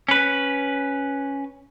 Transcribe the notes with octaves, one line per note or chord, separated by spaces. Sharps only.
C#4 B4